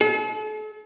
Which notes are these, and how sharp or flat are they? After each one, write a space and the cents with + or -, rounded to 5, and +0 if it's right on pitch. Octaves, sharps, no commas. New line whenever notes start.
A4 -45